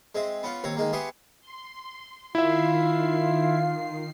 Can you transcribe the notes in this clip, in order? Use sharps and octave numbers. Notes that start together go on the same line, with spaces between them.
G#3 C4 E5
B3 C#4 F4
D#2 C4 C#5 A#5
D#3 G#3 A#3
B3 G4 G#4 E5 C6 C#6
C6
D#3 E4 F4 E5 C7